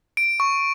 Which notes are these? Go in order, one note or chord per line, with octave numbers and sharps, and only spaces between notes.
D7
C#6